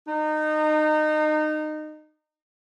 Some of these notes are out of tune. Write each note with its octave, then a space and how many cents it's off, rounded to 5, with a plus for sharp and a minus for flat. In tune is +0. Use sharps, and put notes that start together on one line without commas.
D#4 -25